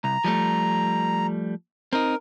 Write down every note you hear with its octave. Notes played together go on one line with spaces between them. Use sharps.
C2 A#5
F3 G3 A3
C4 D#4 A#4